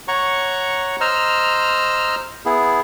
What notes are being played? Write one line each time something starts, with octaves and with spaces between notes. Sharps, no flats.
C#5 F#5 A#5 C#6
C5 D#5 A#5 E6 F6
B3 E4 G#4